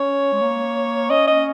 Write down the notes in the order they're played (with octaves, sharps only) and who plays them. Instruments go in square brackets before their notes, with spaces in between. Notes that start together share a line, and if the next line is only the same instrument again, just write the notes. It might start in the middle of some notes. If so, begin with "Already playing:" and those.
Already playing: [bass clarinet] C#4 [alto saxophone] C#5
[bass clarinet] G#3
A#3
[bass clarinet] C#4 [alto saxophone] D#5
[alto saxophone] D#5